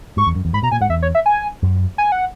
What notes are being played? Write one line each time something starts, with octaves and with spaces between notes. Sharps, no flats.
G#2 C#6
E2
F#2
E2
G#2 B5
B2 A#5
A#2 G#5
G#2 F#5
E2 E5
C#5
E5
G#5
F#2
G#5
F#5